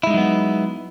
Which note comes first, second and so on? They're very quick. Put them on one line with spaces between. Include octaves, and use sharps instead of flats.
E4 G#3 D#4 F#3 B3